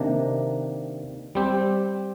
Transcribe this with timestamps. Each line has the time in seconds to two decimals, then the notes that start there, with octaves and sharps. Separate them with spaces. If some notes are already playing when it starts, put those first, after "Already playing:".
Already playing: C3 D#3 A#3 D4
1.35 G3 C4 G4